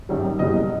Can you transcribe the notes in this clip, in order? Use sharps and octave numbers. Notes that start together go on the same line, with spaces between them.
G#1 F#2 D#3 G3
F#1 E2 B2 G3 D#5